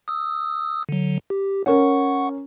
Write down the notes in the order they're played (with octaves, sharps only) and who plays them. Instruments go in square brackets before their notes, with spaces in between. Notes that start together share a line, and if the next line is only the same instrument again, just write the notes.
[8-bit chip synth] D#6 E6
D3 F#3
G4
[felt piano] C#4 A#4 [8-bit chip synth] F#5 C#6